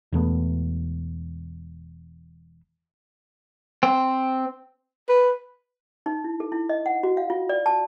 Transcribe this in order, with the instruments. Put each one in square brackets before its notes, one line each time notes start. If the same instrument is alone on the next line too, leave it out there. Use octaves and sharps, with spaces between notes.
[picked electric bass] E1 E2 A3 B3
[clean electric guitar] C4
[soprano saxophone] B4
[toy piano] D#4
E4
A4
E4
D#5
F#5
F#4
F5
F4
D5
A5